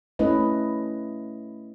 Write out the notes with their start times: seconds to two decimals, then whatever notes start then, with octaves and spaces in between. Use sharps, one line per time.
0.19 A3 C#4 E4 B4 D#5